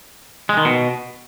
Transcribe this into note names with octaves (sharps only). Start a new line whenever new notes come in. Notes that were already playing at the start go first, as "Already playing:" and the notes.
G#3
D#3
B2